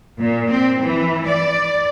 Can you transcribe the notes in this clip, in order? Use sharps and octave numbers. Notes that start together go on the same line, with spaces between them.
A#2
C4
E3
D5